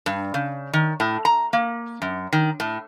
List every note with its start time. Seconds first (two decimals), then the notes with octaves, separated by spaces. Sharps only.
0.06 G2
0.34 C#3
0.73 D#3
1.00 A2
1.25 A#5
1.53 A#3
2.02 F#2
2.33 D#3
2.60 A2